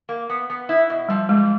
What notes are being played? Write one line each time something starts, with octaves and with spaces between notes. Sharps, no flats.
A#3
B3
B3
E4
B2
F3 G3
G#2 G#3